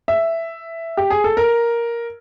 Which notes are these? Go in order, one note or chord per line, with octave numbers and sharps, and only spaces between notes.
E5
G4
G#4
A4
A#4